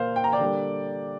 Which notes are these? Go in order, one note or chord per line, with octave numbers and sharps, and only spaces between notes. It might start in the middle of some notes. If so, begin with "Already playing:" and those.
Already playing: A#2 A#3 C5 F5
G5
A#5
D5 G5
D3 G3 A#3